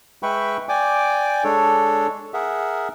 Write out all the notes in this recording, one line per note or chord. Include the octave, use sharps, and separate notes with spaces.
G#3 B4 E5 G5 B5 C#6
D5 G5 G#5 D6
G#3 D4 A4 C#5
G#4 A#4 E5 F#5